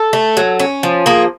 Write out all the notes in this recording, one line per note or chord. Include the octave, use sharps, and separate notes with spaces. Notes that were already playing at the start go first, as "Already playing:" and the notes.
Already playing: A4
A3
F#3
C#4
F3
A#3 G#4